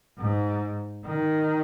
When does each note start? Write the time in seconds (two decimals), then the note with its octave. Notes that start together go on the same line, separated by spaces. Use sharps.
0.18 G#2
1.04 D#3